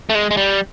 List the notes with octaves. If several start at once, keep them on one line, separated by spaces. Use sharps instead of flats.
A3
G#3
G#3
G3